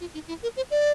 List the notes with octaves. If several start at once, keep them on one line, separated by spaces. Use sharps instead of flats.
F4
D#4
E4
A#4
C5
D5